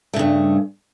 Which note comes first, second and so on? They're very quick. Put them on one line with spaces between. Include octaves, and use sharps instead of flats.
A3 C#3 G2